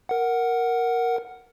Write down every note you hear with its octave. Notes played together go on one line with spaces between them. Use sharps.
A#4 F#5